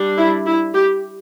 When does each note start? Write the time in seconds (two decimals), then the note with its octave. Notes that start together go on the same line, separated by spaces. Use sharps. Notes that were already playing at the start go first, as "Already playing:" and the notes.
Already playing: G3 D4
0.17 E4
0.45 E4
0.73 G4